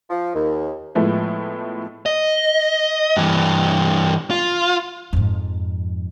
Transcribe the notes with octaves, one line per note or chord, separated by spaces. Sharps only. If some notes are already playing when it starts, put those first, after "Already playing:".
F3
D#2
A2 F3 G#3 A3 B3 E4
D#5
G2 E3
F4
F2 G#2